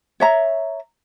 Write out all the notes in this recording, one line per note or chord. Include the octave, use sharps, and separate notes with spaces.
C#5 E5 A#5